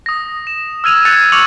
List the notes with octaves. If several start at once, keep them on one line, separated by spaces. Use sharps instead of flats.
D#6 A#6
E7
E6 F6 G#6 D#7 F7
F#6 G#6 A6 C#7 D#7 F7
C#6 D6 C#7 F7 F#7